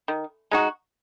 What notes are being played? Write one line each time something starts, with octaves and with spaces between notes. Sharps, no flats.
D#3
G#3 D#4 F#4